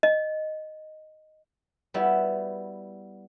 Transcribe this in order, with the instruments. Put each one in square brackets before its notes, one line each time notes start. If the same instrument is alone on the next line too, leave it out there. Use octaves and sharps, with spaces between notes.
[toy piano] D#5
[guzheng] G3 B3 E4 F#4